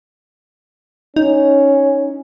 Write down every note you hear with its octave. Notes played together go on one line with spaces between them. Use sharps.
C#4 D#4